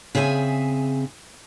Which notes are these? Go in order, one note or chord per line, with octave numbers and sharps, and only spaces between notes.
C#3 C4 G#4 E5 F#5 G#5